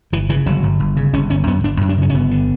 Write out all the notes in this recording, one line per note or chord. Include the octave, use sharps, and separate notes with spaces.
G1 E3
C#3 E3
G1 F#3
G1
G1
C#3
G1 C#4
G1 C#4
F#2 B3
G1 D4
F#2
D4
C#3 C#4
C#4
G1 B3
D3